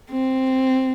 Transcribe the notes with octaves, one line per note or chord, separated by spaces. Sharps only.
C4